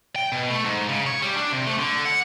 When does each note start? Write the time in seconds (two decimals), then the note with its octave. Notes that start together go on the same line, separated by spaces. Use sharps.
0.16 G5
0.32 B2
0.50 A3
0.65 G#2
0.89 C#3
1.06 C#5
1.22 G3
1.37 D4
1.52 C3
1.67 A3
1.78 D3
2.05 F#5